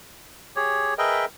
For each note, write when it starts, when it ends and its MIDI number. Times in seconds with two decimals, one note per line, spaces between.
0.56 0.94 67
0.56 0.94 68
0.56 0.94 73
0.98 1.25 68
0.98 1.25 70
0.98 1.25 71
0.98 1.25 75
0.98 1.25 76
0.98 1.25 79